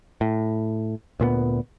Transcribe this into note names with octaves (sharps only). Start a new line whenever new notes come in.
A2
D2 A#2 G#3 B3